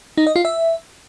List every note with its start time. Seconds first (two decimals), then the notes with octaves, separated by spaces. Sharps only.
0.18 D#4
0.27 D#5
0.36 F4
0.45 E5